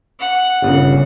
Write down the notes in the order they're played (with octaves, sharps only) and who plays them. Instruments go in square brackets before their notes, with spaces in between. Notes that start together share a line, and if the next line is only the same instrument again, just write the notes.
[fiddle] F#5
[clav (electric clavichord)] G1 [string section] A#2 C#3